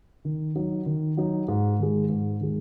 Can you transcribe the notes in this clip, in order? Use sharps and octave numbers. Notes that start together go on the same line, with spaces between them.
D#3
F#3 D#4
D#3
F#3 D#4
G#2
D#3 G#3
G#2
D#3 G#3